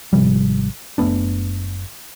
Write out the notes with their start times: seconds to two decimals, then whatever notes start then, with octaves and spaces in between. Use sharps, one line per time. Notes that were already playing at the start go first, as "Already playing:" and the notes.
0.13 G#1 C3 F3 G3
0.98 F#1 A3 B3 D4